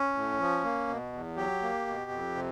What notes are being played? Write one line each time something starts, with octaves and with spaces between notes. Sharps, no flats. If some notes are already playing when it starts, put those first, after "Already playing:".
Already playing: C#4
A2
F3
A#3
B2
E2
F#3 G4
A#3
B2
F2
C3